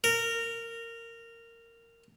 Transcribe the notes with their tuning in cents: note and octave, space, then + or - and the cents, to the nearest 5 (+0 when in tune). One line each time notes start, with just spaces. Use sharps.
A#4 -15